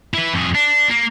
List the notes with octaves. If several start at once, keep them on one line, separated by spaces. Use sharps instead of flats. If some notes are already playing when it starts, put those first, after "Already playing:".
E4 B4
F2 G#4
D4
A#3